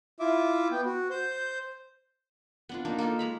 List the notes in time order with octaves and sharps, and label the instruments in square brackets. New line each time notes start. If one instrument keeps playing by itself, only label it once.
[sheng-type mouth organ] E4 F4 E5 D6
B3 G5
F#4
C5 G6
[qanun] B3 D4 F4
A#3 D4 D#4
A#3 D#4 F4 A4
G#3 A#5 B5